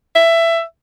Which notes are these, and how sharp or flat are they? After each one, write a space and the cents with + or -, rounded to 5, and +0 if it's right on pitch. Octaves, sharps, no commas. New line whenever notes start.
E5 +15